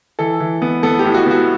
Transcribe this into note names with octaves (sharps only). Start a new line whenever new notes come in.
E3 A4
E3
B3
B3 A4
G4
A2
F#4
B3 F#4